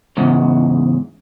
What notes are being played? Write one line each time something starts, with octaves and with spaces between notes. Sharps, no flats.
E2 G#2 C#3